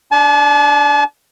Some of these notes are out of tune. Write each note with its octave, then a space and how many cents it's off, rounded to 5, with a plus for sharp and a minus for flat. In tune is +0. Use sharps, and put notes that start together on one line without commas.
D4 +0 A5 -40